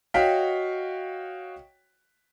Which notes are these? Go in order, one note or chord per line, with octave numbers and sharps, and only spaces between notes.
F#4 C#5 D#5 F5 G5 B6